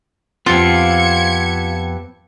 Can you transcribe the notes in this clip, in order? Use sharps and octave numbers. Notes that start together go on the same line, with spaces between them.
F2 B3 C4 F4 G4 A4 G#6 C#7